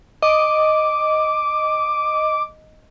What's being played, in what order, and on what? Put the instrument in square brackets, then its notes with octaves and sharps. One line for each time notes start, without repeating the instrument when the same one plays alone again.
[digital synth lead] D#5 [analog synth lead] D6